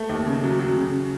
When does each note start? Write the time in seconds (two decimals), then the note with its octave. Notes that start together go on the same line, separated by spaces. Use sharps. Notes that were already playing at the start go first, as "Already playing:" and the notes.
Already playing: A3
0.09 D#2
0.27 C#3
0.44 F#3
0.60 F#3
0.77 C#3